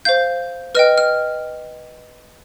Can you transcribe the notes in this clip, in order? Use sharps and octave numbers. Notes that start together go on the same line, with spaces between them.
C5 F5 G6
B4 D#5 G5 F6
F6